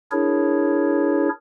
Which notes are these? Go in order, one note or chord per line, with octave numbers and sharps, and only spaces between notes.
D4 E4 G#4 A#4 C#5